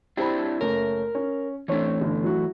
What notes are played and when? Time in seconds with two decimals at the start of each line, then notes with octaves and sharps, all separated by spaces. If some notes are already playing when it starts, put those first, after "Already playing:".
0.17 C4 D4 E4 G4 C5 B5
0.61 F#1 A3 C#4 A#4
1.15 C#4
1.68 E3 A3 C4 D4 C#5
2.01 G1
2.24 F#3 E4 F#4